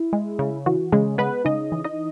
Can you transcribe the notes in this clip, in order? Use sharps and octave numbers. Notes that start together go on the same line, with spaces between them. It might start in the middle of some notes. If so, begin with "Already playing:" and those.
Already playing: E4
G#3
C#3
E3 F#4
C#3 G#3 G#4
G#3 B3 B4
C#3 D#4 D#5
E3
D#4 D#5